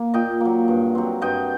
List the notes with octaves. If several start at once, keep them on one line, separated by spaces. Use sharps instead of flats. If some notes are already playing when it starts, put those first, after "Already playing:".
Already playing: A#3
A#2 D#5 G5
F#3 A#3
G2
F#3 C4
G2 D#5 G5